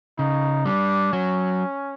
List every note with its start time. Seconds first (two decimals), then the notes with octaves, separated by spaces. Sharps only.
0.18 C#3 D#4
0.65 G3 D4
1.12 F#3 C#4